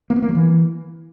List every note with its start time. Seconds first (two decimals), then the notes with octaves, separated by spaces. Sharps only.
0.10 A#3
0.16 B3
0.22 A#3
0.29 F#3
0.35 E3